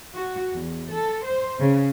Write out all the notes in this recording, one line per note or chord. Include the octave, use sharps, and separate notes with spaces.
F#4
E2
A4
C5
C#3